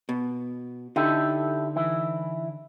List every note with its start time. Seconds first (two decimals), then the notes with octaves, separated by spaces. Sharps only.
0.09 B2
0.96 D3 D#4 E4 G4 A4
1.76 E3 E4